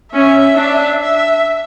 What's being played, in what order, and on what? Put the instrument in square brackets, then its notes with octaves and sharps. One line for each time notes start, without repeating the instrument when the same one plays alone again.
[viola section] C#4 [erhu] E5
[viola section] D4
[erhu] E5